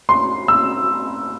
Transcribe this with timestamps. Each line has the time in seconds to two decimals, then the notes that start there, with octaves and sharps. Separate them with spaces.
0.09 C6
0.48 E6